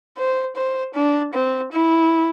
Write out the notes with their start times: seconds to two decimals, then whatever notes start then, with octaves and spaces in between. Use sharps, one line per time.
0.17 C5
0.56 C5
0.94 D4
1.33 C4
1.72 E4